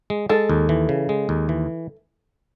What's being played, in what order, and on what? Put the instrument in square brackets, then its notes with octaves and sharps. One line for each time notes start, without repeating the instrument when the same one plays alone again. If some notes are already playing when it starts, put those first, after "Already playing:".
[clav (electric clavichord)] G#3
[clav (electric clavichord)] G#3 [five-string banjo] A4
[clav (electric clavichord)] D#2
E3
C#3
G#3
D#2
E3